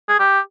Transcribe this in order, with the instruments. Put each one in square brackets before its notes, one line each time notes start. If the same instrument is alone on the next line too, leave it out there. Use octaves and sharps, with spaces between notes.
[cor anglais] G#4
G4